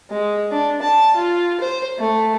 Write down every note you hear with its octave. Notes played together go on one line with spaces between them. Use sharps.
G#3
D4
A5
F4
C5
A3